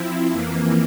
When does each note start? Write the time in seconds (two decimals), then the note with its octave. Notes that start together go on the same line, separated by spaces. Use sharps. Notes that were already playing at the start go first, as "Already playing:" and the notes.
Already playing: F3 C4 E4
0.31 F2 E3 A#3